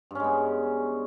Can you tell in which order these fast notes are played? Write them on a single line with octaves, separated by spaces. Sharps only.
G2 C#4 G#3 B3